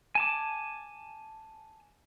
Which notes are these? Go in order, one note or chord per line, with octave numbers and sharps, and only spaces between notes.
G#5 A5 D6